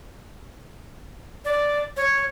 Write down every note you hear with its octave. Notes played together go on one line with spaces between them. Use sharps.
D5
C#5